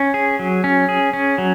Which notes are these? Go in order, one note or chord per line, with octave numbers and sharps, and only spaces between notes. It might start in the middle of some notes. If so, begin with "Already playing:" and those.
Already playing: C#4
G#4
F#3
C#4
G#4
C#4
F#3